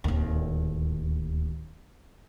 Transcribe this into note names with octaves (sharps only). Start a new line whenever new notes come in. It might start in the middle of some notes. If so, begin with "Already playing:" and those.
D1 D#2